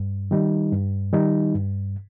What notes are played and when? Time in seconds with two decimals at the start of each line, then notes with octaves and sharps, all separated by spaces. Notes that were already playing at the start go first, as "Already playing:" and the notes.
Already playing: G2
0.31 D#3 G3 D#4
0.72 G2
1.13 D#3 G3 D#4
1.54 G2